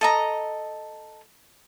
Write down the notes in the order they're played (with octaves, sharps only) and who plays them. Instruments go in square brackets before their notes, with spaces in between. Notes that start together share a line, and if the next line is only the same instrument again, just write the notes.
[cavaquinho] A4 D#5 A#5